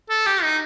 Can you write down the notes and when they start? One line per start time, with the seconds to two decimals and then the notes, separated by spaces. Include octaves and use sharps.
0.10 A4
0.26 G4
0.42 D#4